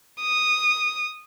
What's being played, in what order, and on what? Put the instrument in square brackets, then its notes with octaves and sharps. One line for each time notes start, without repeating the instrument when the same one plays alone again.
[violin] D#6